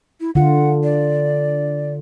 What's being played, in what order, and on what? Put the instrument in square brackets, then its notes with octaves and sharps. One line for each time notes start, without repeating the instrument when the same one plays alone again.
[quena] E4
[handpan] D3 F4 [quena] F#5
[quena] D5